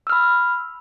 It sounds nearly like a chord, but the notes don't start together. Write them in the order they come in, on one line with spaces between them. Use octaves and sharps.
E6 F6 B5